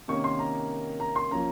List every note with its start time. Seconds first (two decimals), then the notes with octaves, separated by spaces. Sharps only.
0.08 C3 D#3 A#3 C#4 C#6
0.24 C6
0.39 A#5
1.00 A#5
1.16 C6
1.31 F3 A#3 C#4 A#5